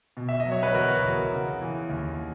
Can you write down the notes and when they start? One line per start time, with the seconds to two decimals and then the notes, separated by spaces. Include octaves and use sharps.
0.17 B2
0.29 E5
0.40 D#5
0.46 F#3
0.52 C#5
0.63 B4
0.74 E2 F#4 A#4
1.03 E2
1.32 C#3
1.61 E3
1.90 D#2